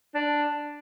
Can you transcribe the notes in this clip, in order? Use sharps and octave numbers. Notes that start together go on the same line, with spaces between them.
D4